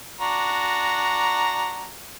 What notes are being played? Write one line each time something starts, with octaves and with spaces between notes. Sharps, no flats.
D4 F#4 A#5